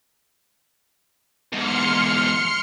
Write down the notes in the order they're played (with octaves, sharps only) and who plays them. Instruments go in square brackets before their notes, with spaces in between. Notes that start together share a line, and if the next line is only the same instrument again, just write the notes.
[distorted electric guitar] E2 G#2 [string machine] C6 F6 C#7